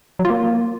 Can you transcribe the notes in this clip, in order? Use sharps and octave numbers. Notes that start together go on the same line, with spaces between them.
F#3
F4
A#3